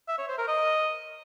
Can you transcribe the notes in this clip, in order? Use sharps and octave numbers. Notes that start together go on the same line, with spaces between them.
E5
C#5
C5
A#4
D#5